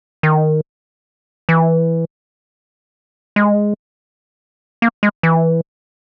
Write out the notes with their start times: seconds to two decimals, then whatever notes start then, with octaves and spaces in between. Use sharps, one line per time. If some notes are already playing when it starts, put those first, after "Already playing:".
0.23 D#3
1.49 E3
3.36 G#3
4.82 A#3
5.03 G#3
5.23 E3